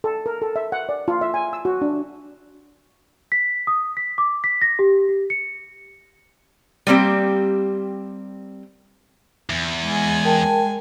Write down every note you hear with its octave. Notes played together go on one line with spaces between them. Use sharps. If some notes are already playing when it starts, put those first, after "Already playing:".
A4
A#4
A4
E5
F#5
D5
F4
E5
G#5
E6
F#4
D4
B6
D#6
B6
D6
B6
A#6
G4
G4
C#7
G3 A#3 C4 G4
E2
G#3 G#5
A#4 G5 A5